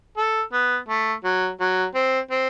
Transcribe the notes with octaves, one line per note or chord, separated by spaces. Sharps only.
A4
B3
A3
F#3
F#3
C4
C4